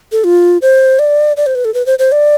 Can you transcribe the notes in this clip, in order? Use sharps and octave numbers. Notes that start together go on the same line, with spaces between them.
A4
F4
C5
D5
D5
C5
B4
A4
B4
C5
C5
D5